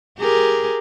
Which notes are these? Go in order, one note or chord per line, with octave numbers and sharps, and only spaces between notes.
G4 G#4 A#4